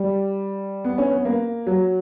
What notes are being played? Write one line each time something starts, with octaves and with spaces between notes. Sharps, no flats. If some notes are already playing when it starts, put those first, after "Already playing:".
Already playing: G3
B3
C#4
B3
A#3
F#3